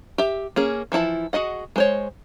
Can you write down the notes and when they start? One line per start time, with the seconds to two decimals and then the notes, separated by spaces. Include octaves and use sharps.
0.18 G4 E5
0.56 A#3 C#4 G#4
0.92 E3 F3 E4 A5
1.33 F#4 G#4 D#5 F#5
1.76 G#3 C5 C#5